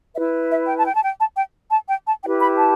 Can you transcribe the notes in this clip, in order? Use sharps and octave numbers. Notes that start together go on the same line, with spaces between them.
E4 B4 E5
E5
G5
A5
G5
A5
G5
A5
G5
A5
G5
A5
E4 G4 B4 G5
B5
A5